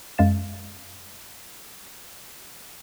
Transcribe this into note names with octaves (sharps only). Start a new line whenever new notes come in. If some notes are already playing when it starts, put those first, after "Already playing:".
F#2 G#3 F5 A6 E7